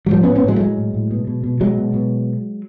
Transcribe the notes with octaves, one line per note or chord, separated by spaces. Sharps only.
F#3
A2 F3 G3
B3 C#4
A2
B3 C#4
A2 F#3 G#3
A3
A2 F#3 G#3
A2
A2
B2
B2
B2
B2 F#3 G#3
B2
B2